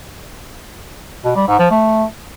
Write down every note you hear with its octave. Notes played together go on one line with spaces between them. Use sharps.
B2
G3
G#2
F3
A3